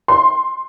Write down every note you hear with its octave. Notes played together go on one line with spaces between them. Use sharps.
C6